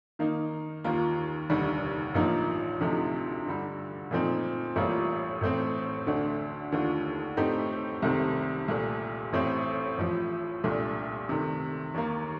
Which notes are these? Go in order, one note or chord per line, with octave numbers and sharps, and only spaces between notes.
D#3 A#3 D#4
D#2 D#3 A#3 F4
F1 D#2 D3 G3
A1 G2 F3 A#3 D#4
D2 C3 F3 A3 D#4
G2 D3 G3
A#2 F3 A3 C4 D#4
A1 A2 G3 A#3 F4
A1 A2 A3 C4
D2 D3 A3 D4
D#2 D3 A3 D4 F4
A2 A3 C4 D#4 G4
C2 C3 D#3 A3 C4
C2 A#2 A3
A1 A2 A3 C4
A1 A2 F3
C2 A#2 A3 D4
C3 D#3 A3
D#2 D#3 A#3